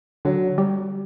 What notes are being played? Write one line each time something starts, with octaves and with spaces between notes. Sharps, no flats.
D3 F#3
G3